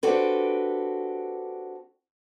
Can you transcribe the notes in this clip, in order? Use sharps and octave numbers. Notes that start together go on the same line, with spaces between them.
C4 D4 F#4 G4 A4 B4